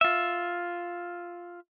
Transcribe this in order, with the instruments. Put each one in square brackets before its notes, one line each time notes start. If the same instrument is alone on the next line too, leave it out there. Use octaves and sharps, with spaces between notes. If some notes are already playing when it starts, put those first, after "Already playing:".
[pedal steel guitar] F4 E5